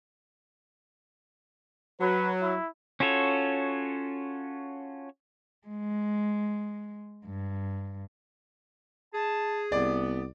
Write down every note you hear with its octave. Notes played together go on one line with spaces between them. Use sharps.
F#3 B4
E4
C#4 F4 F#4 A4 C#5
G#3
G2
G#4 A5
C2 B3 D5